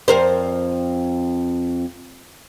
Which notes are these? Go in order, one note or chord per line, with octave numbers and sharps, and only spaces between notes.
F2 A#4 C5